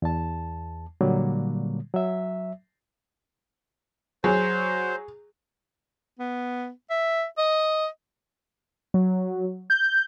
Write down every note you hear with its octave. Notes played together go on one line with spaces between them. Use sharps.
E2 A5
A#2 D3 F#3 G3 A#3
F#3 E5
F#3 G#4 C5
B3
E5
D#5
F#3
G6